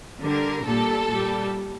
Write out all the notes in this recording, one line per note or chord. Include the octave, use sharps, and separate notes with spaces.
D3 G3 A#4
A#2 G3 A4
A#2 G3